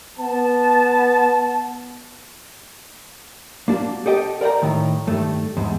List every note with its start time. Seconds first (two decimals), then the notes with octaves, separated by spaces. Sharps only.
0.19 B3 A5
3.68 A#3 D4 F#4
4.06 G4 A4 D#5 G5
4.41 A#4 D5 F#5 G5 A#5
4.62 A2 D#3
5.07 G2 D#3 A3
5.57 E2 G#2